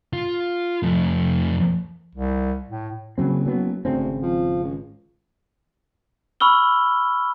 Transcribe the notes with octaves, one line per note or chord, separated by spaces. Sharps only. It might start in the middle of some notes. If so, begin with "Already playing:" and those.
F4
F2 A3
C2
A2
F#1 C#3 F#3 C4
F#3 B3
G#1 D2 C#3 C4
F3
C#2
B5 C#6 E6 F6 G7